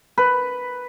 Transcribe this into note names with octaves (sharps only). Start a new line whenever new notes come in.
B4